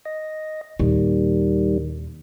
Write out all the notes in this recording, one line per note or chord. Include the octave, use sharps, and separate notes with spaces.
D#5
D#2 A#2 D#3 G3